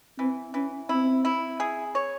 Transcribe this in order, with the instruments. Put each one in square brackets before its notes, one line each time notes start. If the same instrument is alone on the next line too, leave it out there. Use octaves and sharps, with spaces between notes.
[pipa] E3 [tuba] C4
[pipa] E3 [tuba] C#4
[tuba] C4 [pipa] E4
[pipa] E4
G#4
C#5